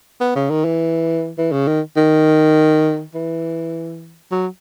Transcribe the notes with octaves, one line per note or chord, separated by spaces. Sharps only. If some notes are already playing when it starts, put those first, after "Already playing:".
B3
C#3
D#3
E3
E3
C#3
D#3
D#3
E3
F#3